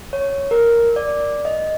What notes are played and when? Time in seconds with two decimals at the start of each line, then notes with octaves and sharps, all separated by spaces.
0.13 C#5
0.51 A#4
0.96 D5
1.45 D#5